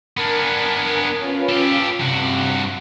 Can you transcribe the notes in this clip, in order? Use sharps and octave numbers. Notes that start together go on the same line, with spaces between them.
B3 D4 A#4 G#5
C#4 F4 B4
G4 A4
G2 C3 F#4